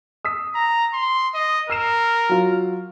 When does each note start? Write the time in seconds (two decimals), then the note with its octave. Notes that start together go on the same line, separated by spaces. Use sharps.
0.25 D#6 E6 B6
0.55 A#5
0.94 C6
1.35 D#5
1.70 A#4 E6 C7 E7
2.29 F#3 F4